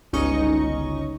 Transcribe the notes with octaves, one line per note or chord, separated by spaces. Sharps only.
G1 C#2 C#4 D#4 D#5 C#6